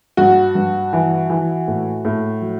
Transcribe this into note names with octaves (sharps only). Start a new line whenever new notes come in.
G2 F#4
G2
E3
E3
A2
A2
F#3